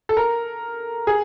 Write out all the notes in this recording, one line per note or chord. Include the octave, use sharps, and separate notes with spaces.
A4
A#4
G#4